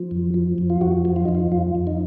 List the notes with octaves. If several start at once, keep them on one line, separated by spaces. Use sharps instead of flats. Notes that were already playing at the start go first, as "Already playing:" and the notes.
Already playing: F3
F2
F3
F2
F4
F2 F#4
F3
F4
F2 D#4
F4
F2 F4
F2
D#4